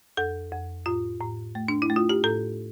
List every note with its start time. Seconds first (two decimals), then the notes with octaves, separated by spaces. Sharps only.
0.17 F2 A4
0.51 F2
0.86 A2 F4
1.21 A2
1.55 A3
1.68 D4
1.82 E4
1.90 A3
1.96 F4
2.09 G4
2.23 A2 A4